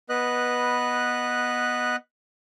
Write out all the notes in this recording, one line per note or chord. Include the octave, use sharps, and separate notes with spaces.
B3 B4 D#5 F#6